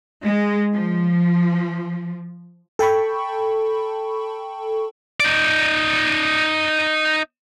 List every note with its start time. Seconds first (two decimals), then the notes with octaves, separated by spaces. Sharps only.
0.24 G#3
0.73 F3
2.79 A4 G5 A5 B5 C#6
5.20 D#4 D5